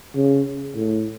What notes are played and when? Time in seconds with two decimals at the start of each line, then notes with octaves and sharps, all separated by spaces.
0.16 C#3
0.76 A2